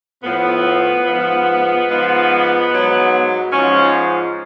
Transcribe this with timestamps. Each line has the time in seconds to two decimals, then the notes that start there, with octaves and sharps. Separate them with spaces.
0.23 A2 F3 B3
1.05 G#2 F3
1.88 G#2 F3
2.69 G#2 F#3
3.52 G#2 F3 C#4